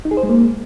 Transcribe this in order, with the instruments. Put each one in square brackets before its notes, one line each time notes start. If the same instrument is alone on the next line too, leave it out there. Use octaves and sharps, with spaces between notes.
[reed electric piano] D#4
G#4
C5
G#3
A#3